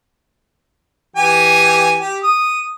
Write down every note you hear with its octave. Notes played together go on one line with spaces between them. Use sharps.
E3 G4 G#5
G4
D#6